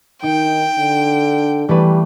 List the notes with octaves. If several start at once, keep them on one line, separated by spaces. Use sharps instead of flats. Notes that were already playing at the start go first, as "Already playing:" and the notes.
D#3 D#4 G5
D3
E3 G3 A3 B4